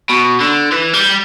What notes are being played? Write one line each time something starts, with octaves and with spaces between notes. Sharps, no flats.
B2
D3
E3
G3